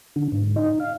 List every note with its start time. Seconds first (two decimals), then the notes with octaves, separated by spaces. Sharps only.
0.16 D3
0.32 G#2
0.56 D#4
0.80 F5